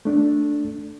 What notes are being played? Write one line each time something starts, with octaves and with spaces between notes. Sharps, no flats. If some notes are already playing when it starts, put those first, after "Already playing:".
A3 D4